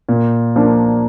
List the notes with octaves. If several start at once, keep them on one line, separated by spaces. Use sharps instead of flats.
A#2
F3 A#3 D4